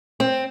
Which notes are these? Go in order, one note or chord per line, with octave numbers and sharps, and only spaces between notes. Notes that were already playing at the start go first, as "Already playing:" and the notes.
C4